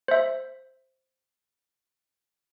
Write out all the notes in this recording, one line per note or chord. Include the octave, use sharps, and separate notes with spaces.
C5 E5